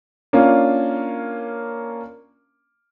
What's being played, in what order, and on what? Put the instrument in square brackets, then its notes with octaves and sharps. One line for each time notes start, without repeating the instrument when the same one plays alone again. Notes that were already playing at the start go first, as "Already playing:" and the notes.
[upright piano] A#3 C#4 D4 F4